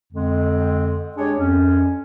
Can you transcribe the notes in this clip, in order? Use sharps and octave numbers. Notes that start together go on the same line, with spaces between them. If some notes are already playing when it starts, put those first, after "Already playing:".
F2 D3 G#3 C4
G#3 D4 G4 G#4 C#5
F2 C#4